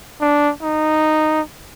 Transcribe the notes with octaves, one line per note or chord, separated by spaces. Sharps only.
D4
D#4